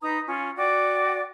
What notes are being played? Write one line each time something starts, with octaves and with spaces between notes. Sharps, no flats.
D#4 B4 A#5 D#6
C#4 F4
F#4 D5 G5 D6